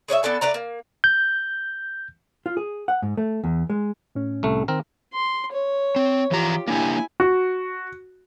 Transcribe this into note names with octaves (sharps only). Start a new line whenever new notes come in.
G#4 C#5 D5 E5
B3 D4 A4 G#5
A3 B4 D5 A#5
A#3
G6
F4
G#4
F#5
G#2
A3
E2
G#3
A2 C#4
C2 A3
D#3 C4 A#4
C6
C#5
C4
E3 F3 F4 G4 A#5
A#3 D4 E4 G4 G#5
F#4